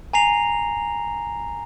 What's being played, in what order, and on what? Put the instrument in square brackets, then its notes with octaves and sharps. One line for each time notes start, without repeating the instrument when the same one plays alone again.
[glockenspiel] G#5 A#5 A#6 C7 F7